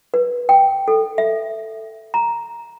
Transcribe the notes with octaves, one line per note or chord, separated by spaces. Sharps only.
B4
G5
A4
E5
A#5